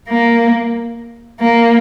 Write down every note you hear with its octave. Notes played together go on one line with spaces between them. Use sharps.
A#3
A#3